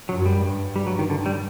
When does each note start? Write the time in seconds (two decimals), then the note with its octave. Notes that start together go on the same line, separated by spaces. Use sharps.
0.09 F#2 F#3
0.26 G3
0.42 G2
0.76 G3
0.87 F#3
0.99 D#3
1.10 D3
1.26 G3